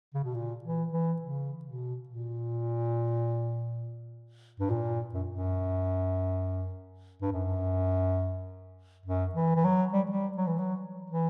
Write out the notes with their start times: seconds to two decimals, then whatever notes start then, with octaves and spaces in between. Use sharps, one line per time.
0.14 C#3
0.24 B2
0.34 A#2
0.64 E3
0.92 E3
1.22 C#3
1.65 B2
2.09 A#2
4.60 G2
4.70 A#2
5.14 F#2
5.30 F#2
7.22 G2
7.32 F#2
9.06 F#2
9.35 E3
9.56 E3
9.64 F#3
9.93 G3
10.10 G3
10.37 F#3
10.47 E3
10.58 F#3
11.10 E3